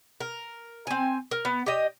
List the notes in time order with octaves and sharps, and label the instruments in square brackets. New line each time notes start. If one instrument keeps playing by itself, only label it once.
[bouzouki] A#4
C4 G#5
A#4
B3
G4 D#5